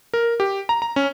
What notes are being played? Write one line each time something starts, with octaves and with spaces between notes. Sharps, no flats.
A#4
G4
A#5
A#5
C#4